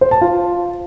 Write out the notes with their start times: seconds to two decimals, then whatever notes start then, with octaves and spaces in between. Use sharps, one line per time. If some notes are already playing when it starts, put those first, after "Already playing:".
0.01 C5
0.11 A5
0.21 F4